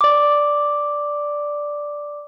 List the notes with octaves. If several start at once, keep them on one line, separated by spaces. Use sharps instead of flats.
D5 D6